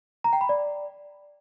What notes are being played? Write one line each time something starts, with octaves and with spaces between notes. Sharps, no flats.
A#5
G5
B5
D5